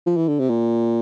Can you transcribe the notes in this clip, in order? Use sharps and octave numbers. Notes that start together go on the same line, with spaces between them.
F3
E3
D3
C3
A#2